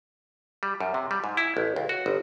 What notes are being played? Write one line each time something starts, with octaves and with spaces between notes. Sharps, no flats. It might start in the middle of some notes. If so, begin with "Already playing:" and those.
G3
F#2
C3
G3
G#2
E4
A1
C#2
F#4
G1